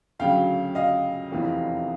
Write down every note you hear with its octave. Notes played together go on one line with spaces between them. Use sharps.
D2 C#3 F#3 F5 G5
D#5 F5
F1 E2 C3 E3